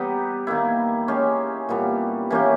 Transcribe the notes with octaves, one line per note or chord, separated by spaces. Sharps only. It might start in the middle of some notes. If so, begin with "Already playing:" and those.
Already playing: G3 B3 D#4 G4
D#3 A#3 E4
G#3 C#4 G4
A#2 G3 B3
E3 A#3 C#4 G4